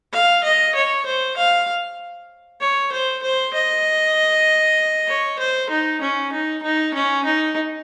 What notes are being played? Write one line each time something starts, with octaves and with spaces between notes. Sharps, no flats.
F5
D#5
C#5
C5
F5
C#5
C5
C5
D#5
C#5
C5
D#4
C#4
D#4
D#4
C#4
D#4